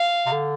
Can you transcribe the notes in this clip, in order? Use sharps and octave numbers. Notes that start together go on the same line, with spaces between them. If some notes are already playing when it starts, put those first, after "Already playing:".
Already playing: F5
C3
D3